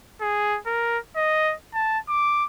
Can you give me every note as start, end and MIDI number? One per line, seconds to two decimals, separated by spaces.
0.21 0.59 68
0.66 0.99 70
1.16 1.54 75
1.74 1.99 81
2.09 2.45 86